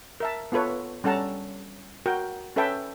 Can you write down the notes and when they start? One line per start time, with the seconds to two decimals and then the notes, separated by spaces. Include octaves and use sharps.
0.20 A#4 E5 A5
0.52 B3 F4 A4 B4 C#5
1.04 G3 C#4 A4 F#5 A5 A#5
2.06 F#4 A#4 G5
2.56 C#4 A4 B4 E5 G5 A5